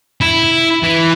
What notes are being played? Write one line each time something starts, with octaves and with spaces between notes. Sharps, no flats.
E4
E3